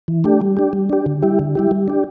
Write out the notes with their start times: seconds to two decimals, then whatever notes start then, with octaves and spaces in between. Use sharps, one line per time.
0.08 E3
0.24 A3 D4 G4
0.41 G3
0.57 D4 G4
0.73 G3
0.90 D4 G4
1.06 D3
1.22 G3 E4 G4
1.39 D3
1.55 G3 E4 G4
1.71 G3
1.88 D4 G4